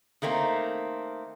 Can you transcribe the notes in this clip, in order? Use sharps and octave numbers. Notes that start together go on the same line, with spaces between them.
D#3 A3 A#3 C4